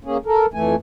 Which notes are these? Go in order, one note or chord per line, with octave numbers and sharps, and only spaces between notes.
A#3 C#4 G#4
A4 A#4
F2 E3 A3 G#5